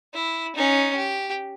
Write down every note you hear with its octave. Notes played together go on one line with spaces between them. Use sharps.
E4
C#4 D#4
G4